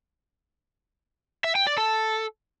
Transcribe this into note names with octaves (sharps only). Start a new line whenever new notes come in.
E5
G5
D5
A4